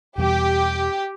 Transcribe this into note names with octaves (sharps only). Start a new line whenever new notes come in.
E2 B2 G3 G4